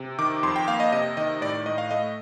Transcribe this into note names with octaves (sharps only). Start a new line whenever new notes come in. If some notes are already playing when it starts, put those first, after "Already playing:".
Already playing: C3
D#3 D6
F2 C6
G5
A#3 F5
D#5
C3 D#5
D#3 D#5
A2 D5
A2 D#5
F5
A3 D#5